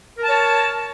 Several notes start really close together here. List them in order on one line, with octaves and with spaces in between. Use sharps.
A#4 A5 C#5